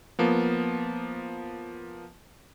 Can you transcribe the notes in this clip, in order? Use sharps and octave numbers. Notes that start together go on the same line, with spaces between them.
F3 A#3 B3